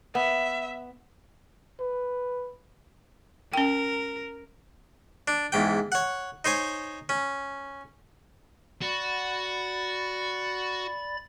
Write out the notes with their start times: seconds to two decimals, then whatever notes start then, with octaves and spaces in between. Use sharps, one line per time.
0.15 B3 E5
1.80 B4
3.53 C#4 A#4 G5
5.28 D4
5.52 E2 G#2 G5
5.92 C#5 F#5
6.45 D#4 C5 C#5 G#5
7.09 C#4
8.82 F#4 D5 B5 A6